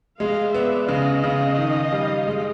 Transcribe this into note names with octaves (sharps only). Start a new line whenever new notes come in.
G#3 D#5 F5
B3 D5 E5
C#3 D#5 F5
C#3
D#3
G3
G#3